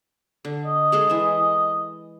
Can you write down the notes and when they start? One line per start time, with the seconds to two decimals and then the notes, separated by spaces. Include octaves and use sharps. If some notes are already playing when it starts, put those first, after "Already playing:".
0.45 D3
0.65 D#5
0.92 G#3 G#4 A4
1.10 E3 E5